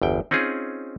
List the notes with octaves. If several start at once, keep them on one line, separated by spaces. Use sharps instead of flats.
G1 E2 G5
C4 C#4 D#4 F4 G#4